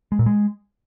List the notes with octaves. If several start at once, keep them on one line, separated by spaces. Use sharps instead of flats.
G#3
A#2
G#3